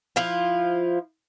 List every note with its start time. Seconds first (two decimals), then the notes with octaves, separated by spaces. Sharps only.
0.16 F3 E4 F4